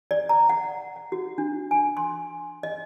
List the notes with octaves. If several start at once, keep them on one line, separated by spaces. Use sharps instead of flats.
D5
A#5
F#5
F#5
F#4
D4
G#5
C6
D#5